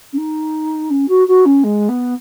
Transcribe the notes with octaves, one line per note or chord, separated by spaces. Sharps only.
C#4
D#4
C#4
F#4
F#4
C#4
G#3
B3